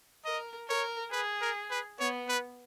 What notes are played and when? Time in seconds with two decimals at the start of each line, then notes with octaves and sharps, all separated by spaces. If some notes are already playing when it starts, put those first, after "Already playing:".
0.25 A#4 D#5
0.68 A#4 C#5
1.12 G#4 B4
1.41 A#4
1.71 B4
1.99 B3 C#5
2.29 B4